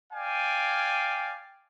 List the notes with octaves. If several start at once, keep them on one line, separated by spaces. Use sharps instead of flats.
D5 F5 G5 G#5